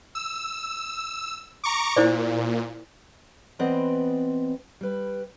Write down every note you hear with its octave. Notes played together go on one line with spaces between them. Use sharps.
E6
A#5 C#6 D6
A#2 E4 C5 D5
E3 B3 C4 B4 D5 D#5
G3 B4